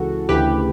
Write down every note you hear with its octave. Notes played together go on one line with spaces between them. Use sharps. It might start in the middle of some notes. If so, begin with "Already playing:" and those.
Already playing: C#2 C#3 E3 F#4 A4
D2 C#3 E3 G4 B4